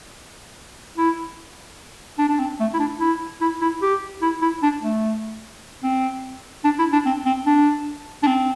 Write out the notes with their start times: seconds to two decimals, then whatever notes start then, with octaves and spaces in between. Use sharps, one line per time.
0.97 E4
2.18 D4
2.29 D4
2.39 C4
2.60 A3
2.74 E4
2.79 D4
3.00 E4
3.41 E4
3.61 E4
3.82 G4
4.22 E4
4.42 E4
4.62 D4
4.82 A3
5.83 C4
6.64 D4
6.79 E4
6.93 D4
7.06 C4
7.26 C4
7.46 D4
8.23 D4
8.27 C4